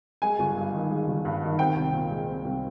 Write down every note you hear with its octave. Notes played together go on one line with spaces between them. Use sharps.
G#3 G#5
G1
G2
D#3
G#3
G1
G2
D#3
C4 G5
C2
A#2
G#3
C4
C2